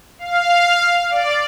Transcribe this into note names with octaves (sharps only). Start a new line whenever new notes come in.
F5
D5